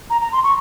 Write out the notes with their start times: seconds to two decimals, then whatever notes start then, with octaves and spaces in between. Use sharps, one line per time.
0.10 A#5
0.21 A#5
0.32 C6
0.44 C#6